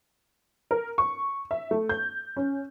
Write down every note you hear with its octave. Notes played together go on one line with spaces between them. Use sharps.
A#4
C#6
E5
A3
G6
C#4